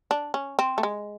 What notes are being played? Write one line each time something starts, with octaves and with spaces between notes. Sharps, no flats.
D4
C#4
C4
A3
G#3